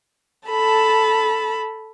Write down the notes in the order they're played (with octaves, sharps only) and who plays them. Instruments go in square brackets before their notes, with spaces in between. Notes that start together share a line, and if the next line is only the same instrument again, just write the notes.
[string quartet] A4 A5 B5